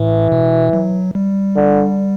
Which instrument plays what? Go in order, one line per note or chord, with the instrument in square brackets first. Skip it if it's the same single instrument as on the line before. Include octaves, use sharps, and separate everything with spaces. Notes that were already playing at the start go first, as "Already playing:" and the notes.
Already playing: [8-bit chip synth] A2 [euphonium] E3
[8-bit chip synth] B2
F#3
G3
[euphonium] D3